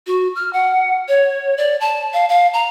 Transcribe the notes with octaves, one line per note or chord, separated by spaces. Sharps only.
F#4
F6
F#5
C#5
D5
A5
F5
F5
A#5